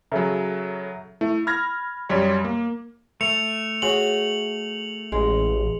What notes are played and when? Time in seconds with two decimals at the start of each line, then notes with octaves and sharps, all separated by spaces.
0.12 C#3 F#3 A4 E5 A#5
1.21 A3 E4
1.47 B5 F6 G#6 A#6
2.09 F#2 G3 C#5
2.44 A#3
3.21 A3 C#7 F7
3.82 F#4 G#4 C#5 F#7
5.12 A1 G#3